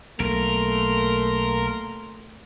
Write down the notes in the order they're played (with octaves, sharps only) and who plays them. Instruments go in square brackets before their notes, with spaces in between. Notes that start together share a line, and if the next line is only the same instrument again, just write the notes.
[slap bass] B1 [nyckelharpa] A3 C6 [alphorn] A#3 [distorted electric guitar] A#4